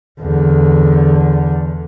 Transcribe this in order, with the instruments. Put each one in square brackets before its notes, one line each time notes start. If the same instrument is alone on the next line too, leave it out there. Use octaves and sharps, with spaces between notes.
[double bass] E2 D3